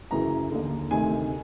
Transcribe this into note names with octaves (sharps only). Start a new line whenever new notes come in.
F#2 C#3 E3 A#5
D#2 D3
D2 C3 D#3 G#5